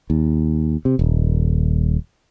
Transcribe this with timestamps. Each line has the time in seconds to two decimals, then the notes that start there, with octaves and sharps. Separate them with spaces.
0.10 D#2
0.85 C3
0.99 D#1